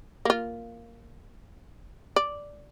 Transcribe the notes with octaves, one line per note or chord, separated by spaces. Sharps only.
A#3 F4
D5